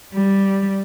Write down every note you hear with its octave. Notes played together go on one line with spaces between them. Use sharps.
G3